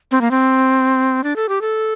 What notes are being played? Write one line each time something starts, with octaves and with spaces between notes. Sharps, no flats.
C4
A#3
C4
D4
A4
G4
A4